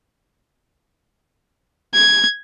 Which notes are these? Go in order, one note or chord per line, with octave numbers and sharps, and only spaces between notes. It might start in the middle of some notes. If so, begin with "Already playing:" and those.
G#6